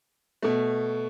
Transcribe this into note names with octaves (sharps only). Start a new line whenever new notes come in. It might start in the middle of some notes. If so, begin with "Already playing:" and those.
B2 A3